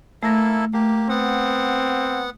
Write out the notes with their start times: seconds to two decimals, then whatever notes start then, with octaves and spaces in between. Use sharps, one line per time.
0.23 A3 A#3 E4 A4 A#6
0.73 A3 A#3 G4
1.09 B3 C4 F#5